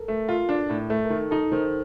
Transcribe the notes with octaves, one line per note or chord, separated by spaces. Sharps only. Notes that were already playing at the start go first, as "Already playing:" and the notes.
Already playing: A4 A#4
A3
F4
D4
A2
A3
A#4
D#3 A4
D#4 A4
D#3 C5